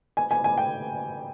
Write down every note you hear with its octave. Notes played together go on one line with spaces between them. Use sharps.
G#5
G#5
G#5
G5